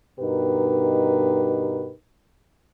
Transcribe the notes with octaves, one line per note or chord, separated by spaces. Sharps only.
G2 B2 D#4 G4 A#4 B4